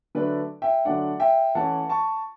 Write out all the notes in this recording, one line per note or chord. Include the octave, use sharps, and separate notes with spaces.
D3 F#3 A3 D4 B4 D5
E5 G5
D3 F#3 A3 D4 D5 F#5
E5 G5
E3 A3 C#4 F#5 A5
A5 C#6